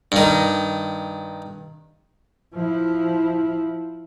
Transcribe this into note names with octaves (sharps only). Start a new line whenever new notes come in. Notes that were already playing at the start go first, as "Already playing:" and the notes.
G2 D#3
F3 E4